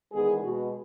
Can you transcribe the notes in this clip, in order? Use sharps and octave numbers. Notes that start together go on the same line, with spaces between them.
E2 D#3 G#3 B3 G#4
B2 G#3 B3 F#4